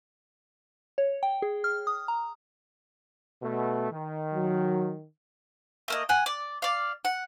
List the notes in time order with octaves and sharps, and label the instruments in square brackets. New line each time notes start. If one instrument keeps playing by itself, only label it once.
[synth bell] C#5
G5
G#4
F6
D#6
A#5
[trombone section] B2 A3
D#3
[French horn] F#3
[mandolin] A3 A#3 D#5
F#5 G#5
D5
D5 F5
F#5